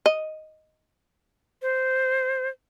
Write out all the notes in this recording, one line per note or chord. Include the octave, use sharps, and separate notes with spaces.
D#5
C5